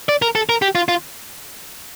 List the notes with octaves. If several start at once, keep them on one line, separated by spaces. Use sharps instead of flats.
D5
A#4
A4
A#4
G4
F4
F4